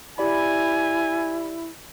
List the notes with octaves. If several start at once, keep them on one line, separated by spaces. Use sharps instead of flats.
E4 G4 D5 G#5 B5